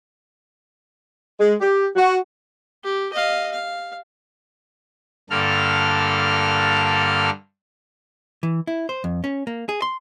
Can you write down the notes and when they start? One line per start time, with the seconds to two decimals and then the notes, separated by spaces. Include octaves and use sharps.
1.40 G#3
1.61 G4
1.96 F#4
2.84 G4
3.13 D#5 F5
3.52 F5
5.30 G2 D3 A#3 A4 F6
8.43 E3
8.67 E4
8.89 C5
9.04 F2
9.24 C#4
9.47 A#3
9.69 G#4
9.82 C6